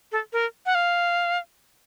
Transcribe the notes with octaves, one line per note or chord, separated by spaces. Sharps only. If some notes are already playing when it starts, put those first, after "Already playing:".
A4
A#4
F#5
F5